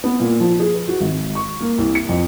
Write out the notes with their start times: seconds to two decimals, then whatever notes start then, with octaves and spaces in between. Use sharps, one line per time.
0.04 B3
0.20 A#2
0.40 F3
0.60 G#4
0.74 B4
0.88 F#4
1.00 G#1
1.35 C#6
1.60 A#3
1.78 C2
1.95 C#7
2.09 F2